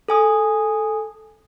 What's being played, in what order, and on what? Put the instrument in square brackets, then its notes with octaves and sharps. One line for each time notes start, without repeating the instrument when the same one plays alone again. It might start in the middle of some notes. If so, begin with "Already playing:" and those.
[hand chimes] A4 G#5 D#6